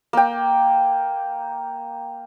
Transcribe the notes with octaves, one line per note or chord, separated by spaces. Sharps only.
A#3 G5